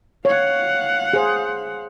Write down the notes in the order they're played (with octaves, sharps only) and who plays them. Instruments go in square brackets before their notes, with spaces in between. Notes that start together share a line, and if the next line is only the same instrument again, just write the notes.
[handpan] C#5 [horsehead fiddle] F5 F#5
[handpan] G#4 C5